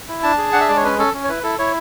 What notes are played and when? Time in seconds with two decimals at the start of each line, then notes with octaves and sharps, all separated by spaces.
0.09 E4
0.23 D4 A5
0.38 G#4
0.53 D4 F#5
0.61 E5
0.69 G#3 D5
0.76 C#5
0.84 C#4 B4
0.99 C#4 A4
1.14 C#4
1.24 C#5
1.29 E4 B4
1.43 E4 A4
1.59 E4 C#5